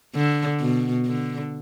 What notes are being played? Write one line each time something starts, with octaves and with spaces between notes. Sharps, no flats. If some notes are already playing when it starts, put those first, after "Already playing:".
D3
B2
D3